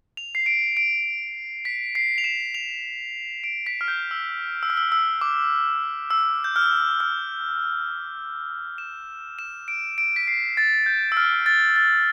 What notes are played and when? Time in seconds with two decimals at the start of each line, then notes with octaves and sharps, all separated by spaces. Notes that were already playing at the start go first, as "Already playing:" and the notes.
0.17 F7
0.35 C7
0.46 D7
0.77 D7
1.65 B6
1.95 C7
2.18 F7
2.24 E7
2.54 F7
3.44 D7
3.67 B6
3.81 F6
3.88 G6
4.11 E6
4.63 E6
4.70 F6
4.77 E6
4.92 E6
5.21 D6
6.10 E6
6.44 G6
6.56 F6
7.00 F6
8.78 E7
9.39 E7
9.68 D7
9.98 D7
10.16 B6
10.28 C7
10.57 A6
10.86 G6
11.12 E6
11.17 F6
11.46 A6
11.76 A6